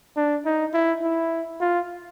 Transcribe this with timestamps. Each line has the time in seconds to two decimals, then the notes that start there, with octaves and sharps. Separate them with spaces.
0.17 D4
0.46 D#4
0.74 E4
1.03 E4
1.60 F4